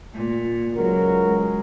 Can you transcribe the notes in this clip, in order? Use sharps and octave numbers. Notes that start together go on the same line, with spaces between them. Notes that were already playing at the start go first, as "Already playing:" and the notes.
A#2
C#2 F#3 F#4 A#4
G#3